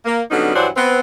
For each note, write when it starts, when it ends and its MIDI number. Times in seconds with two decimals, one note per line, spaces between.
0.05 0.21 58
0.31 0.54 50
0.31 0.54 54
0.31 0.54 55
0.31 0.54 59
0.31 0.54 61
0.31 0.54 63
0.55 0.68 43
0.55 0.68 52
0.55 0.68 54
0.55 0.68 62
0.55 0.68 72
0.55 0.68 78
0.76 1.00 59
0.76 1.00 60
0.76 1.00 71